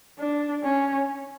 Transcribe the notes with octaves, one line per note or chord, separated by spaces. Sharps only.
D4
C#4